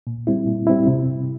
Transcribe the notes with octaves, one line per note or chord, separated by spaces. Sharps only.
A#2
G3 C4 E4
A#2
G3 C4 E4
C3